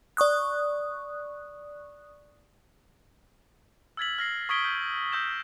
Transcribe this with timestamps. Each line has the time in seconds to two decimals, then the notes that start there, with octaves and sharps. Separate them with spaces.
0.17 D5 C#6 D#6 F#6
3.97 E6 F6 G#6 A6 B6 F#7
4.18 F6 A#6 C7
4.49 C#6 D#6 G#6 B6 D7 G7
4.65 G6
5.12 C#6 E6 G6 A#6 E7